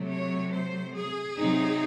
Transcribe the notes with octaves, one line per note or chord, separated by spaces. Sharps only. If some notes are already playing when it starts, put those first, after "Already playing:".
Already playing: C3 F#3 A3
C#5
C5
G#4
C3 F#3 C4 D#4